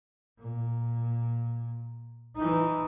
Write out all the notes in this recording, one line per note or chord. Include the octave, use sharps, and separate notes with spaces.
A#2
E3 D#4